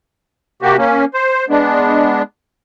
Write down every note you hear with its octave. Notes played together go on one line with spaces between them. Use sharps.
C3 A#3 F#4 G4
A#3 C#4
C5
G#3 B3 D4